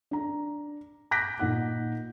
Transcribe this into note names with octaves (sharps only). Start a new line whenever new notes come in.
D4 A#5
D6 F#6 G6 A#6 B6 D7
A#2 D#4 F#5 F#6